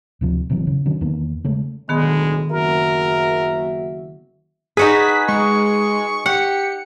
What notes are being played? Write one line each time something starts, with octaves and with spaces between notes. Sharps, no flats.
D2 C3 F3
E1 C3 E3 F#3
C#3
D3 D#3 F#3 C#4
E2 D#3 A#3 B3
C#3 G#3 A3 C#4
B1 A2 D3 D#3 G#3 B3 G#4
F#1 F#4 A#4 E5
D#4 F#4 G#4 B4 B6
G#3 C#6
G4 F#5 C#7